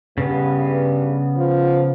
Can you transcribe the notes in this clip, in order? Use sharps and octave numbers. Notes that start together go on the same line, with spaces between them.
G2 C#3 B3
F3